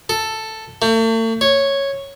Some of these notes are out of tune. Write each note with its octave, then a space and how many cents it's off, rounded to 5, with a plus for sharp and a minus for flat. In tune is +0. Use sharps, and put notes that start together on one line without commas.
A4 +5
A3 +40
C#5 -5